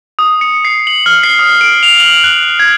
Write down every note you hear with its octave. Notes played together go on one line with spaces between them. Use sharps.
D#6
C#7
C7
F#7
F6
C7
D#6
D7
F7
F#7
F#6
G#6